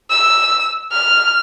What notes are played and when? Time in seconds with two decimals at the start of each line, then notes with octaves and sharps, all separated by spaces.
0.11 E6
0.92 F6